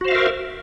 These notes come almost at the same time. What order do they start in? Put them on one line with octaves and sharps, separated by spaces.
F#4 C5 F5 E5 A#4